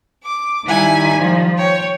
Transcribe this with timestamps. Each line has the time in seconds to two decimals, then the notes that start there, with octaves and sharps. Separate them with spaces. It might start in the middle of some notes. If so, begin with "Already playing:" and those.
0.22 D6
0.67 D#3 G3 E4 G#5
1.17 F3
1.57 C#5 G5